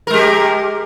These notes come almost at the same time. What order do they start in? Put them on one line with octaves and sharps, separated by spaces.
A#4 G#3 G4